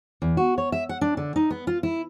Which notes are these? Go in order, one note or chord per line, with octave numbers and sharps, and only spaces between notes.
E2
F#4
C#5
E5
F#5
D4
D3
D#4
B3
F4
E4